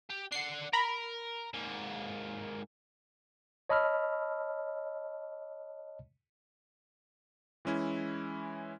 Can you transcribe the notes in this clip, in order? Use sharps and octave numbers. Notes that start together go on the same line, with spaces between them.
G4
D4 F#5 C7
A#4 A#5 B5
G#2 A#3
C#5 D#5 A5 B5 E6 F6
E3 G#3 C#4 E4